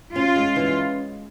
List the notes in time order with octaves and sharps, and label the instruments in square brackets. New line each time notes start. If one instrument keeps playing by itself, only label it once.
[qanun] C#4 [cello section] F4
[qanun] G#3
E3